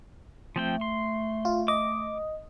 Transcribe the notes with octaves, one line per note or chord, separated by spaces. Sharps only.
F3 A3 C4 G5
C6
F4
D#5 D6